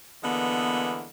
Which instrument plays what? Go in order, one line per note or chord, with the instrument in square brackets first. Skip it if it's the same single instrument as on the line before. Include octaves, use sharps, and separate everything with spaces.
[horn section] D3 E3 G#3 A#3 B3